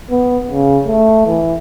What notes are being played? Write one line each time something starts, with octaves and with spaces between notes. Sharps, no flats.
B3
C#3
A3
E3